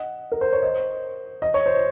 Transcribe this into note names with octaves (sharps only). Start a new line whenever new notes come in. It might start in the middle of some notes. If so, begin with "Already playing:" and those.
Already playing: D#5 F#5
A#4
C5
C#5
C5 D#5
D#5
C#5
C5